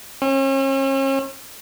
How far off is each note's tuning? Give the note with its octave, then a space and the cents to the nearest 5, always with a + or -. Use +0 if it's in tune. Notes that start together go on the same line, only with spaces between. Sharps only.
C#4 -40